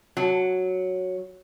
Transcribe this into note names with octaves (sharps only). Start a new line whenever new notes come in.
F#3